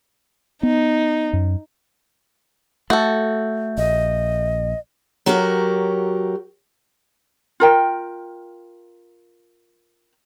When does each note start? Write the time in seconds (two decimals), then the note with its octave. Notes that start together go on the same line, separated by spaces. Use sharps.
0.63 B3 D#4
1.33 F#2
2.90 A3 F#4 A4 E5 G6
3.78 A#1 D#5
5.26 F#3 F#4 G4 A4 A#4
7.60 F4 A#4 G5